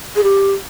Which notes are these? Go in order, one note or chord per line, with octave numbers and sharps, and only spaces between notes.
G#4
G4